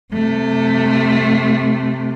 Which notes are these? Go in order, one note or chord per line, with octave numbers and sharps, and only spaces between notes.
C3 A3